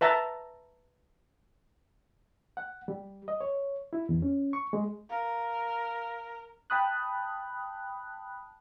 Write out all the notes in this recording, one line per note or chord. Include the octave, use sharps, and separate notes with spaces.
B4 E5 A5 A#5
F#5
G3
D#5
C#5
E4
E2
C#4
C#6
G#3
A#4 F5
G5 A5 B5 D#6 F#6